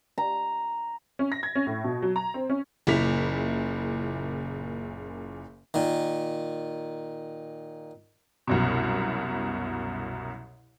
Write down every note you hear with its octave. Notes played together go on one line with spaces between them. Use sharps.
A#5
C#4
A#6
G#6
C#4
A2
B2
F#3
A#5
C4
C#4
F#1 A#2 C#3 E4 B6 F7
A#2 D#3
C2 F#2 B2